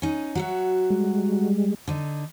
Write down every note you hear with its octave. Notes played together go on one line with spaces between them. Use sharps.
C#4 D#4
F#3 F#4 E5
G3 G#3
D3 D#4